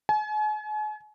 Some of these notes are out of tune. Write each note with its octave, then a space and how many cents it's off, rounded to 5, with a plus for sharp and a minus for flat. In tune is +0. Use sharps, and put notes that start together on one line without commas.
G#5 +40